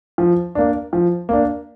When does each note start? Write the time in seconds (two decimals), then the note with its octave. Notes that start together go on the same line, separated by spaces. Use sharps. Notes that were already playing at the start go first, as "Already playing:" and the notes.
0.18 F3
0.55 A#3 D4
0.93 F3
1.29 A#3 D4